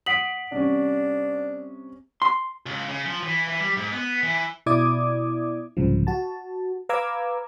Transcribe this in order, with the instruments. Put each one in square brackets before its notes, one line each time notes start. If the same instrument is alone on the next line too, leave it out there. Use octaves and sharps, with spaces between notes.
[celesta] F#5 B6 F#7 [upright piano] D#6 C7 D7
[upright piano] C3 G3 C#4 [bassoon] D4
[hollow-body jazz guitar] C6
[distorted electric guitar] C#2
C#3
F3
E3
E3
G3
G#2
B3
E3
[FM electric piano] B2 E4 D5 D6 D#6 G#6
C2 G#2 C#3 F3
F#4 A5
B4 F5 A#5 D6 E6 G#6